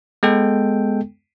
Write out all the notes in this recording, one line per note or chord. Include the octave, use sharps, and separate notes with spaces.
G#3 B3 A4 G5